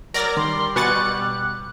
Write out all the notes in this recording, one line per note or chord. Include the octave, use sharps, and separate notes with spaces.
F#3 A#4 D5 A#6
D#3 G3 C6
B2 B4 F#5 G#5 C#6 F#6 A6